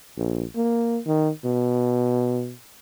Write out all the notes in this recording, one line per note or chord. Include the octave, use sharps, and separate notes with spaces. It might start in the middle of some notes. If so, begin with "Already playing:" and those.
A#1
A#3
D#3
B2